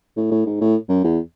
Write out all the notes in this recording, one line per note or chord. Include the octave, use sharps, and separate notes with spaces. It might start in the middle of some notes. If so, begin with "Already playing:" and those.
A2
A2
G#2
A2
F#2
E2